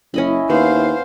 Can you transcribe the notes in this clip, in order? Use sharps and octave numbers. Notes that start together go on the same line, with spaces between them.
F#1 C#4 E4 D#5 B5
D#2 B3 C5 F5